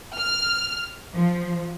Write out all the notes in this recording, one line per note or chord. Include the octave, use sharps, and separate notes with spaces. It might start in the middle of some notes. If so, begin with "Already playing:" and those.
F6
F3